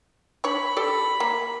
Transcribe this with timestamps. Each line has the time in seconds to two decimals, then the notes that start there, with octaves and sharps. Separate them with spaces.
0.44 D4 C#5 B5
0.77 G4 A4 D5
1.20 A#3